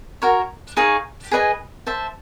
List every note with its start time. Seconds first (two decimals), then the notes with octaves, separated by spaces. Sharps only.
0.22 F#4 A#4 C#5
0.77 D#4 G#4 C#5 F5
1.31 G#4 B4 D#5 G#5
1.87 C5 E5 A5